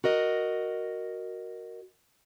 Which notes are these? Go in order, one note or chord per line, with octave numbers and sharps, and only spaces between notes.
F#4 A#4 D#5